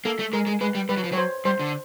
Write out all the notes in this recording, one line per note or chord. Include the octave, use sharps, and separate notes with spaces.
A#3 A4
A3
G#3 A#4
G#3
G#3 B4
G3
G3 B4
F#3
F3
F#3 C#5
C5
G3 C5
D3